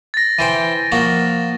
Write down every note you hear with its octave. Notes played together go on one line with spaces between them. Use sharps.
A6 A#6
E3 C5 G5 D#7
F3 A#3 F#4